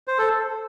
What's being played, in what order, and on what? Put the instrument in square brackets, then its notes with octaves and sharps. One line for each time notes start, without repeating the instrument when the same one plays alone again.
[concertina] C5
A4